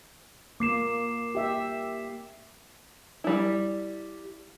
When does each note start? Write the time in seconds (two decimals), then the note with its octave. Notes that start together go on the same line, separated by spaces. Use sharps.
0.60 A#3 D6 C7 E7
1.35 G4 E5
3.24 G3 E4